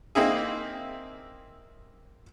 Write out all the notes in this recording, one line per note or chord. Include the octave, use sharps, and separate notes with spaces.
A#3 C4 D#4 E4 G#4